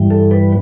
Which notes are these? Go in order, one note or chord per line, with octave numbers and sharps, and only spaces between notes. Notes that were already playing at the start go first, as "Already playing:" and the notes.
Already playing: G2 E3 G3
A4
B4